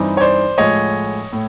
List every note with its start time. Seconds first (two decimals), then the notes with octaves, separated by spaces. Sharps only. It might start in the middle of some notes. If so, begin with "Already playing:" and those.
Already playing: G2 E3 G3 C4 D#4
0.17 C#5
0.21 C5 D5
0.58 A2 F3 G#3 C#5 D#5
1.33 A2